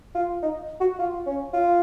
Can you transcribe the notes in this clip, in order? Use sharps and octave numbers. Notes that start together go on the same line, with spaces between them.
F4
D#4
F#4
F4
C#4
F4